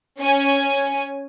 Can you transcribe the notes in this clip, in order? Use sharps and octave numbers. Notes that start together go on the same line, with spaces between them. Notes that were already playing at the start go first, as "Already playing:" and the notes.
C#4 G#5